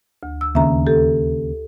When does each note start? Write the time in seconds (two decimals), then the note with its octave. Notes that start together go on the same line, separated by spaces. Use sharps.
0.23 D2
0.41 E6
0.55 D#2 C#3 E5 A#5
0.87 G4 A4